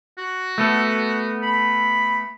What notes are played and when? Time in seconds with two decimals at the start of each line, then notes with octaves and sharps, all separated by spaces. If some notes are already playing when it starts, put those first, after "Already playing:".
0.18 F#4
0.58 A3 B3 A4
1.42 B5